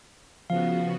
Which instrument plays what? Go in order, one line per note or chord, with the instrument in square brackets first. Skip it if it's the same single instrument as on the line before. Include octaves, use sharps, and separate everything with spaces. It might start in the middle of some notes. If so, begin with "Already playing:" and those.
[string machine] C#3 B3 F#4 [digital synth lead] F3 [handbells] F5